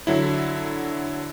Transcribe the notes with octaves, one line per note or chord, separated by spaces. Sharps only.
D3 F#3 E4